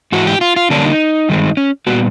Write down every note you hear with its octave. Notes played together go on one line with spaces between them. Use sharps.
G#2 E3 F#4
G4
F4
F4
D3 G3 A#3 C#4 D4
D#4
G2 D#3 G#3 C4
C#4
A#2 G3 B3 F#4